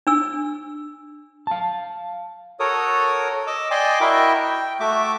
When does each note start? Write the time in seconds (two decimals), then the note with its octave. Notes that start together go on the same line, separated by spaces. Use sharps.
0.07 D4 E6
1.47 F5 A5
2.60 F#4 A4 A#4 C#5 D#6
3.47 D#5 D6 E6
3.71 D5 D#5 G5 G#5 C6 D6
4.01 E4 F#4 A#4 D#5 E5 G5
4.44 G5
4.80 A3 F#4 E5 D6